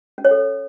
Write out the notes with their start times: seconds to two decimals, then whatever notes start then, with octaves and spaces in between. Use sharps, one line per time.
0.18 C#4
0.25 C#5
0.31 A4